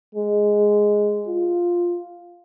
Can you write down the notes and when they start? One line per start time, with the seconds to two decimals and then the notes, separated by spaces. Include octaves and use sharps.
0.15 G#3
1.28 F4